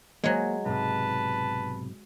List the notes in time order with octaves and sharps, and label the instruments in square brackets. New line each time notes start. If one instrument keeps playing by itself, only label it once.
[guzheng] F#3 G#3 [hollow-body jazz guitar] A#3
[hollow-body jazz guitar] B1 G#2 C3 [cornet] B4 [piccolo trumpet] A5